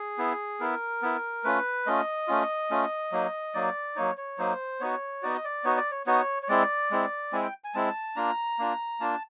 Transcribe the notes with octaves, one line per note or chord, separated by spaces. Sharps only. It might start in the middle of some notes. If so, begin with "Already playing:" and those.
Already playing: G#4
B3 E4
B3 E4 A#4
B3 E4
A3 C#4 F4 B4
A3 C#4 F4 D#5
A3 C#4 F4
A3 C#4 F4
F#3 A#3 D#4
F#3 A#3 D#4 D5
F#3 A#3 D#4 C#5
C#5
F#3 A#3 D#4 C5
B3 D#4 F#4 C#5
B3 D#4 F#4 D5
D#5
D5
B3 D#4 F#4 C#5
D5
C#5
B3 D#4 F#4 C#5
C#5
G#3 C4 E4 D5
G#3 C4 E4
G#3 C4 E4 G#5
G5
G#5
G#3 C4 E4 A5
A#3 D4 F4 A#5
A#3 D4 F4
A#3 D4 F4 A5